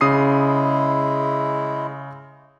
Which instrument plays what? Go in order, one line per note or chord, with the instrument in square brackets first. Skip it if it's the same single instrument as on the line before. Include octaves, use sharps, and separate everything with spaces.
[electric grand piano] C#3 D#6 C7 [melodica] G#3 E4